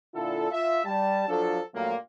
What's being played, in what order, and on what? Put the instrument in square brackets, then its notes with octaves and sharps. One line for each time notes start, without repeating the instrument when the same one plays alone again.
[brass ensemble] A#2 D3 E4 F4 A4
F4 E5
G3 A5
F3 F#3 D4 F4 A4
G2 A#2 F#3 A3 A#3